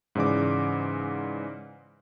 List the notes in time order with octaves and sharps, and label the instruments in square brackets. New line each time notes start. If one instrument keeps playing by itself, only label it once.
[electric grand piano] G#2 C#3 E3 D5 D6